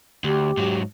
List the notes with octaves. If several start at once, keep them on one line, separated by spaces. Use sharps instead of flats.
D2 G4
G#2 F#3